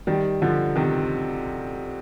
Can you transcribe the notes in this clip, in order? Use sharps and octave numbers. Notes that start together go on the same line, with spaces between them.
D#3 G3
D3 F3
C3 D#3